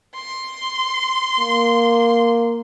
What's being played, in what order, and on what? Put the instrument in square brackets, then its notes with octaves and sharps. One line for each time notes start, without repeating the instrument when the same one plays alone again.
[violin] C6
[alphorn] A#3